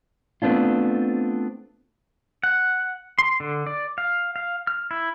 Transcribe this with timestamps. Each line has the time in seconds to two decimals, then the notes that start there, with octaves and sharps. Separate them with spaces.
0.42 A3 B3 C4 D4 F4
2.43 F#5
3.19 C6
3.40 D3
3.67 D5
3.98 F5
4.36 F5
4.67 F6
4.91 E4